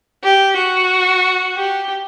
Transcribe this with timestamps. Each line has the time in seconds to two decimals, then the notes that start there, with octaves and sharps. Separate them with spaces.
0.24 G4
0.58 F#4
1.56 G4